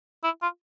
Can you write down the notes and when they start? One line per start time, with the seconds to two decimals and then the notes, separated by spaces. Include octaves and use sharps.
0.24 E4
0.42 F4